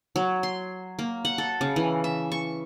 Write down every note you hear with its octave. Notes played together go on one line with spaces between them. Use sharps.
F#3
C6
A#3
F#5
A4
C#3
E3
E5
C#6